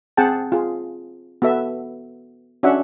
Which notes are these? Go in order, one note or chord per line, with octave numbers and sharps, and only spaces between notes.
C4 G#4 F#5 G5 A5
F4 G#4
B3 F#4 A4 E5
C#4 D4 F#4 E5 F#5